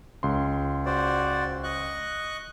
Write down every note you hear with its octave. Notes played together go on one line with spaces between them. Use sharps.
C#2 C6
F#4 C5 D5
D#5 C#6 F#6